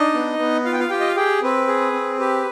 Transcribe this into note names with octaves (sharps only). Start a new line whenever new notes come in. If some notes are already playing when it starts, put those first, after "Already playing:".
Already playing: D4 D#4 D#5
B3
B3
F4 F5
G5
F4 F5
F4 G4 G5
D#5
F5
G4 G#4 G5
C4 B4
G#4
C4
G4 B4